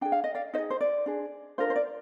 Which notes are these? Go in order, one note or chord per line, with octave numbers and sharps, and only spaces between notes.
D4 G#4 G5
F5
D#5
D5 F5
D#4 G#4 C5 D#5
C5
D5
D4 G#4
D4 F4 A#4 C5
C5
D5